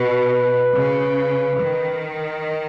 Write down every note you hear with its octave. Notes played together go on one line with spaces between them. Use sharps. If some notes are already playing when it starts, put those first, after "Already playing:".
Already playing: B2 B4
C#3
D#3